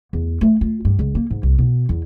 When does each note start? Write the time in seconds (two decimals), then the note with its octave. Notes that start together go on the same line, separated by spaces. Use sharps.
0.13 E2
0.41 A3
0.61 F4
0.85 G2
0.99 C#2
1.15 A#3
1.31 G#2
1.43 C2
1.58 B2
1.89 E2